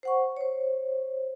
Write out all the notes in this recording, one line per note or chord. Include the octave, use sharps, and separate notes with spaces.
C5 F#5 C#6
C5 C#5